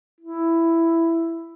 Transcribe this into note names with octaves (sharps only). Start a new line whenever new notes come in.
E4